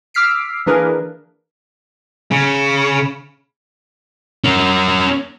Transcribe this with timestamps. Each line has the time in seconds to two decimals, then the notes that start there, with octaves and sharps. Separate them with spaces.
0.14 D6 E6 F6 B6 C7 D7
0.66 E3 A#3 D4 G#4 A#4 B4
2.31 C#3
4.44 C#4 A#4